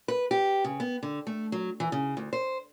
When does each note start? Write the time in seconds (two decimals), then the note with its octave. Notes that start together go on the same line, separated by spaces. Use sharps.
0.08 B4
0.31 G4
0.64 C#3
0.80 B3
1.03 D3
1.27 A3
1.52 F#3
1.80 E3
1.92 C#3
2.17 D2
2.33 C5